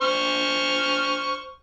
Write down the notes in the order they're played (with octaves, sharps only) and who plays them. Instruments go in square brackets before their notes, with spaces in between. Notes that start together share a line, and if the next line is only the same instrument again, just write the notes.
[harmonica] C5 C#6 F6